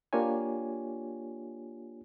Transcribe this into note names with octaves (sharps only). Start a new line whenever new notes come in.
A#3 D4 F4 G4 C#5 G#5